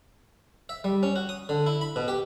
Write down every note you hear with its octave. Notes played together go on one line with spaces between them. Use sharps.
E5
G3
C#4
F#4
D#6
D3
E4
B5
B2
G4